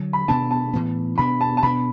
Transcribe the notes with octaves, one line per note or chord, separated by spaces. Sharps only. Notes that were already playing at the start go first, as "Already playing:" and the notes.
Already playing: D3 F#3
B5
B2 B3 D4 A5
A5
A2 E3 B3
B2 B3 D4 B5
A5
A5
B2 B3 D4 B5